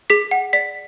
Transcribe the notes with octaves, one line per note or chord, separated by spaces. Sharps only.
G#4 B6
F#5
D5 B6